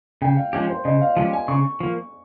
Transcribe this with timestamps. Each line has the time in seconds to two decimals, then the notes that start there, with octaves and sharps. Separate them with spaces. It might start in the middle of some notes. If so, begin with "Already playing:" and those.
0.22 C#3 G5
0.37 F5
0.53 F3 G#3 C#4 G4
0.70 C5
0.85 C#3 D#5
1.01 F5
1.17 F3 G#3 C#4 G4 F5
1.33 G#5
1.48 C#3 C#6
1.80 F3 A#3